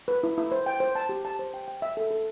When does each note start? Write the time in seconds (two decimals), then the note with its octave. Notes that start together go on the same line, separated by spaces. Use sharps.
0.08 B4
0.23 E4
0.38 E4
0.52 C5
0.66 G5
0.80 C5
0.95 A5
1.09 G4
1.25 A5
1.39 C5
1.54 G5
1.68 G5
1.82 E5
1.97 A4
2.11 A4